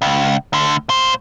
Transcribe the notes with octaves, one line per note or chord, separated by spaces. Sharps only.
C#2
D2 D3
A#2 C5